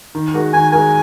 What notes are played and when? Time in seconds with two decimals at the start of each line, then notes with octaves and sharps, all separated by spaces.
0.15 D#3
0.34 G#3 F#4 A#4
0.53 D#3 G#5
0.71 G#3 F#4 A#4 G#5